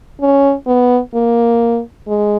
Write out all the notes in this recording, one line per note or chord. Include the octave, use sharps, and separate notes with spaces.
C#4
B3
A#3
G#3